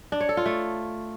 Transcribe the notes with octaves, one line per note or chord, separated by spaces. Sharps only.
D4
C#5
A4
F4
A3